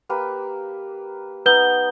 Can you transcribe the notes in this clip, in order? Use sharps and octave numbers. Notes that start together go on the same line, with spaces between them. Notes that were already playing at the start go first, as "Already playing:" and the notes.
A#3 G4 B4
B3 D#4 B4 G6 G7